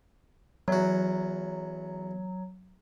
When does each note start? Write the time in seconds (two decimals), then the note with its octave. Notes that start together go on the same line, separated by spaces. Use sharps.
0.68 E2 F#3 F#4